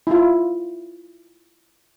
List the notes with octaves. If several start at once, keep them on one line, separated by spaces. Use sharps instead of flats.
E4 F4